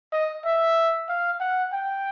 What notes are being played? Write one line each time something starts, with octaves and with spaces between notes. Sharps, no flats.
D#5
E5
F5
F#5
G5